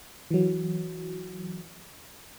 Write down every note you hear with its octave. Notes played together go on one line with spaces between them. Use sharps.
E3 F#3